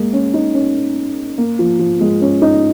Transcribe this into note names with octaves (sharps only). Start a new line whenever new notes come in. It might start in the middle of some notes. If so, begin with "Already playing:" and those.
Already playing: G#3 A#3
C#4
D#4
C#4
A#3
F3
F3
G#3
C#4
D#4